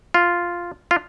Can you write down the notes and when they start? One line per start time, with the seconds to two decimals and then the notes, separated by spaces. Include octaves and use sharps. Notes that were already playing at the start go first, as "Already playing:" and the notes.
0.14 F4
0.91 F4